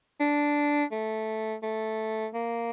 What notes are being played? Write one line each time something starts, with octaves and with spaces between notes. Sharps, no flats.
D4
A3
A3
A#3